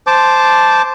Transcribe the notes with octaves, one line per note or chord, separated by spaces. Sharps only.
C5 A5 D6